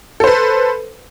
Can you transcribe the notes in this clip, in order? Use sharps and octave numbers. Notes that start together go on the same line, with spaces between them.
A4 B4 C5